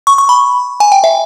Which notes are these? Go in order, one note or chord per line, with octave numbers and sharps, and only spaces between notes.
C#6
C#6
B5
G#5
G5
E5